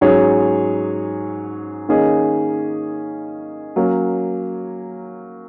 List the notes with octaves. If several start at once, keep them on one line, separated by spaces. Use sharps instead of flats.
G#2 F#3 C#4 G#4 C#5
D#3 A#3 C#4 G#4 D#5
F#3 A#3 C#4